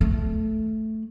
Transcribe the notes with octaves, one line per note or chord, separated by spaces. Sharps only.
A3